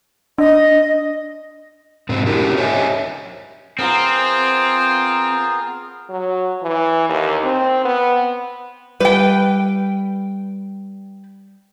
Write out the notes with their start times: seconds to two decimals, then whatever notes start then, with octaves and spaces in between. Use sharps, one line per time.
0.38 D4 D#5
2.09 G#2 B2 C4
2.26 C#4 D4 E4 F#4 G4 A#4
2.57 G4 C5 C#5 D#5 E5 G#5
3.79 B3 C4 F4 G#4 A#4 A#5
6.10 F#3
6.63 E3
7.09 D#2
7.44 C4
7.85 B3
9.00 G3 B4 G5